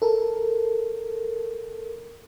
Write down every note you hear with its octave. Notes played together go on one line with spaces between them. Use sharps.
A4 A#4